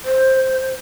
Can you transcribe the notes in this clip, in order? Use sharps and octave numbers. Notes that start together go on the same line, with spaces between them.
C5